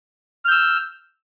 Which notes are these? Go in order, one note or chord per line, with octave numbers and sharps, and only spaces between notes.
E6 F6 G6